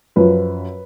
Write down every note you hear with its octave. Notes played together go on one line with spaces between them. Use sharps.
F#2 F3 B4